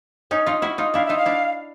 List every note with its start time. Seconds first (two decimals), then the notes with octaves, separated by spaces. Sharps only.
0.31 C#4 D#4
0.46 D#4 F4
0.62 E4 F#4
0.78 D#4 F4
0.94 D4 E4 F5
1.06 D#4 F4 E5
1.18 F5
1.26 D4 E4